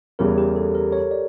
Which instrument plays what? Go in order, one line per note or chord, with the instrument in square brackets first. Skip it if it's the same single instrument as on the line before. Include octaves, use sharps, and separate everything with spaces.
[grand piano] E2 C#3 E3 G3 [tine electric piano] A#4
[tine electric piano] G4
A4
A#4
C#5
D5